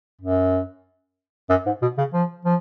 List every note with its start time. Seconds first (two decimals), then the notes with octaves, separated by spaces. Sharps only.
0.21 F#2
1.50 F#2
1.66 G#2
1.82 B2
1.98 C#3
2.13 F3
2.45 F3